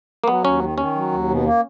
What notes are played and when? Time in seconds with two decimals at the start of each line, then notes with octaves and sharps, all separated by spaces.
0.24 A#3
0.28 F#3 B3
0.44 D#2 C#4
0.61 D#3
0.78 D#3 C#4
0.95 F#3
1.11 D#2
1.28 B2
1.45 A#3